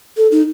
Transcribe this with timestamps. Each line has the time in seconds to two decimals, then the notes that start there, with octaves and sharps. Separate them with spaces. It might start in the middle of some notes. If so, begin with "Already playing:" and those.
0.17 A4
0.32 D#4